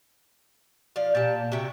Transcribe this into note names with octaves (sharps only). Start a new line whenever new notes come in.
F3 D5 F5
A#2 G4 A5
C3 F#4 E5 G5